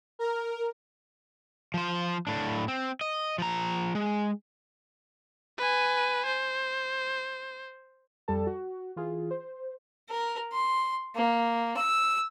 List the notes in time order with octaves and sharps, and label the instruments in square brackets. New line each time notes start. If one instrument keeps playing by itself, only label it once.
[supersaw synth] A#4
[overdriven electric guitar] F3 C5
A2 D4
C4
D#5
F3 A#5
G#3
[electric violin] B4 G#5
C5
[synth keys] F2 G3 A4 A5
F#4
E3 F4 G#4
C5
[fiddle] A#4
C6
A#3
E6